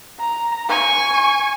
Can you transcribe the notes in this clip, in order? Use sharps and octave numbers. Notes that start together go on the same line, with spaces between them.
A#5
G#5 C#6